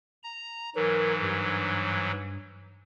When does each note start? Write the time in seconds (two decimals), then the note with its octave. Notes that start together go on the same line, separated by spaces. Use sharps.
0.23 A#5
0.76 G#2 E3 F#3 A#4
1.22 G2